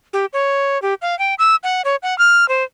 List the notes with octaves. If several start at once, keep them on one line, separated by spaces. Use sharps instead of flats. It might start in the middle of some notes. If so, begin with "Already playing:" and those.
G4
C#5
G4
F5
G5
E6
F#5
C#5
F#5
F6
C5